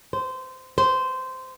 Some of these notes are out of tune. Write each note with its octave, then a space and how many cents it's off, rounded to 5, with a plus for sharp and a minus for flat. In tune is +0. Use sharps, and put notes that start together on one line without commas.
C5 -20
C5 -15